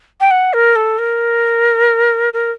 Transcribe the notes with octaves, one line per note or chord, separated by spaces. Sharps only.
G5
F#5
A#4
A4
A#4
A#4